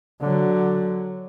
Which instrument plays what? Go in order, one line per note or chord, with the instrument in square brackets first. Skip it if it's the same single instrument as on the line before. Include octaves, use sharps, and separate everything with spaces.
[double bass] D3 F#3